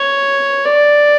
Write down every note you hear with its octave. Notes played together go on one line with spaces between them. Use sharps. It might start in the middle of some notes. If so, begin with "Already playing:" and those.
Already playing: C#5
D5